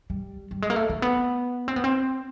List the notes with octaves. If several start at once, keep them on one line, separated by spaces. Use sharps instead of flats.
G3
G3
G#3
A#3
A3
A3
B3
C4
B3
C4